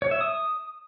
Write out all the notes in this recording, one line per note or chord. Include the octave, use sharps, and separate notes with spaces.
C#5
E5
D#6